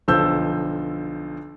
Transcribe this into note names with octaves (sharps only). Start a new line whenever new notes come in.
B1 D3 F3 A4 E6 G6